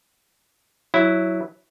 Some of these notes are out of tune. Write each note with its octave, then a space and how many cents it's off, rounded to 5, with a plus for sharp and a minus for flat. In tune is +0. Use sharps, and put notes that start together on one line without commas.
F#3 +0 E4 +0